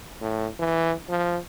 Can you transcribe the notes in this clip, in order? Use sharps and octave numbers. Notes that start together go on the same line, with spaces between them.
A2
E3
F3